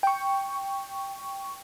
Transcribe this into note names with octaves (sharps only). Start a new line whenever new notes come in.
G5 C#6